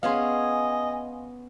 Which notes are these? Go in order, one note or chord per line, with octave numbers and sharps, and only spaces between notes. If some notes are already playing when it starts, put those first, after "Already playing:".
B3 C#4 G#4 D#5 F5 G#5 C6